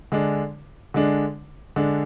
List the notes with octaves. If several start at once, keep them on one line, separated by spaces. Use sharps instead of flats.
D3 G#3 D4
D3 G#3 D4
D3 G#3 D4